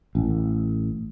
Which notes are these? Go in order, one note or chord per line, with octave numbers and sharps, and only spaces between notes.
A1